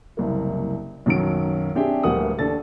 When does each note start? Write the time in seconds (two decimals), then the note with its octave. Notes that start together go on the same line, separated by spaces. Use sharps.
0.17 F#1 C2 A#3
1.06 B1 F#2 D#3 F#3 D7
1.75 C4 D4 G4 G#4 E5 G5
2.03 D1 D2 G3 A#3 F#5 D#6
2.39 D#2 D4 A4 A6